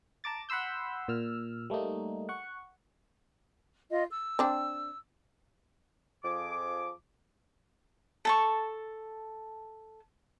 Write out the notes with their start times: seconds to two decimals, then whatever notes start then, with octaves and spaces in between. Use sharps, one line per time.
0.24 A5 A#5 D6 A6
0.49 F#5 B5 C6 E6 G6
1.08 A#2 E6 F6
1.70 G3 A3 A#3 D#4
2.29 F#5 C#6
3.90 F4 D#5
4.12 E6
4.39 C4 D4
6.23 F2 F3 G#4 D6
8.25 A4 A5 C#6